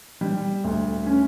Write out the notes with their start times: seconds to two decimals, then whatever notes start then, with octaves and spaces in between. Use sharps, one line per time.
0.21 G3
0.64 D2
1.06 C#4